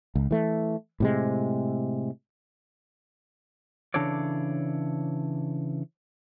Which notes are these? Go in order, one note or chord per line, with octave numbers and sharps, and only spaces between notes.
C#2
E3 A3
A2 C3 G#3
C#3 E3 D4 A4 C#5 D5